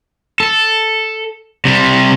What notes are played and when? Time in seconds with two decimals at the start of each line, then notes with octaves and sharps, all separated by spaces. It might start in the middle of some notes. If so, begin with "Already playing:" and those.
0.40 A4
1.65 C3 G3